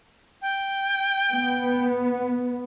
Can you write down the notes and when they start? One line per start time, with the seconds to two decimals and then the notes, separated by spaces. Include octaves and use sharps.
0.42 G5
1.31 B3